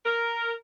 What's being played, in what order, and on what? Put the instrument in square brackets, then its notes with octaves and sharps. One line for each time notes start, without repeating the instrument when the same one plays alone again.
[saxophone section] A#4